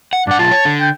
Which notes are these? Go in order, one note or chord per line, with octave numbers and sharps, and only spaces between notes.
F#5
G2 D4 F#5
B1 F4 A5
C#5
D3
G5